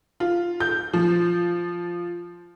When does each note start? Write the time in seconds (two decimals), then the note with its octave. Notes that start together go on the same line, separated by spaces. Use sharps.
0.20 F4
0.60 G6
0.93 F3